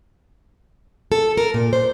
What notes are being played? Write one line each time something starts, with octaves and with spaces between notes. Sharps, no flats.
A4
A#4
A#2
C5